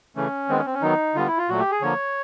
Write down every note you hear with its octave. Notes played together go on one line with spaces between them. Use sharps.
C#3 E3 A3 C#4
D#3 G#3 B3 C4
C#4
C4
C#4
D#3 F#3 B3 D#4
D3 G3 B3 F4
E4
F4
A#2 F#3 A3 F#4
G4
G#4
D3 F3 A#3 C#5